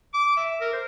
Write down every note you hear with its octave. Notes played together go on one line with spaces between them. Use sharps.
D6
E5
A#4
C5